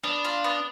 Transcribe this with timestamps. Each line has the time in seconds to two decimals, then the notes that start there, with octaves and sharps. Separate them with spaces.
0.03 B3 D4
0.24 F4
0.44 B3